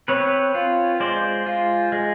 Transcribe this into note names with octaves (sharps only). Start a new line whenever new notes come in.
C4 B4 C#5
F4
G#3 C5 D5
F4
G#3